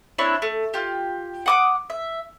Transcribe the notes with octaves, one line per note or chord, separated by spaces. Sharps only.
C4 D4 E4 C#5
A3
F4 G4
F#5 D6 D#6
E5